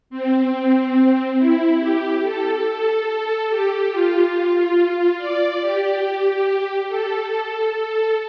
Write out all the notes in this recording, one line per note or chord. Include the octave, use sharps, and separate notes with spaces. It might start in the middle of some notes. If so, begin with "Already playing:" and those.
C4
E4
G4
A4
A4
A4
G4
F4
F4
F4
D5
G4
A4
A4